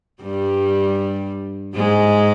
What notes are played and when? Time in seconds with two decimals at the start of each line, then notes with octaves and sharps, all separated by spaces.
0.22 G2 G3
1.75 G#2 G#3